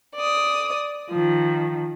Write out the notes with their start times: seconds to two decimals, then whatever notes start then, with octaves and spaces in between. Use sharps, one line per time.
0.16 D5 D#6
1.11 D#3 F3